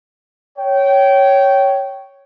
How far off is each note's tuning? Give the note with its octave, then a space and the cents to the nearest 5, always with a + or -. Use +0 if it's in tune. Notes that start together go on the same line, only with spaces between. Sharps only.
C#5 +0 G5 -20